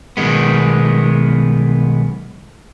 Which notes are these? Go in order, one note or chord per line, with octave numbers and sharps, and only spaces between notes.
B1 D#3 G#3 B3